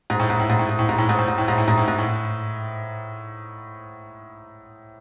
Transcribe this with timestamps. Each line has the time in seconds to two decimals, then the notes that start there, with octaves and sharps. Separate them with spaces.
0.10 G#2
0.20 A2
0.30 G#2
0.40 A2
0.50 G#2
0.59 A2
0.69 G#2
0.79 A2
0.89 G#2
0.98 A2
1.09 G#2
1.19 A2
1.28 G#2
1.38 A2
1.48 G#2
1.58 A2
1.68 G#2
1.78 A2
1.88 G#2
1.99 A2